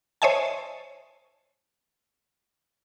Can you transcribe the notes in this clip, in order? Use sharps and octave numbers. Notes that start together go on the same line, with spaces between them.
C5 C#5 D#5 E5 G#5 A5